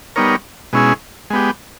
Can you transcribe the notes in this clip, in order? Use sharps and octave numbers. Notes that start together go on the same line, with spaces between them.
G3 B3 D#4 A#4 C#5
B2 G#3 C#4 E4 G#4
G#3 B3 G4